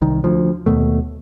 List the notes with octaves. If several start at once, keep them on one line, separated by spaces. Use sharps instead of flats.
C2 D#3
D2 F3
D#2 B2 A3